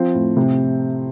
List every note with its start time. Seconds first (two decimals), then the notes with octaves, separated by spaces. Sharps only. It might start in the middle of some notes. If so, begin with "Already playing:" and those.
Already playing: F3 C4
0.14 A2
0.37 C3